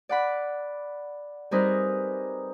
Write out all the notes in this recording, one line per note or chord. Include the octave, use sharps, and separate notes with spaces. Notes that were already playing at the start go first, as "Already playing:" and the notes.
D5 F#5 B5
G3 C4 D#4 G#4 A#4 B4